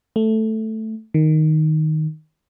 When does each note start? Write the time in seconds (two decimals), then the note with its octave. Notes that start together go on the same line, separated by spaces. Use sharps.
0.16 A3
1.14 D#3